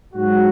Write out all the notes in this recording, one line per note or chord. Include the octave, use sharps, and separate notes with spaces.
G#2 F#3 F#4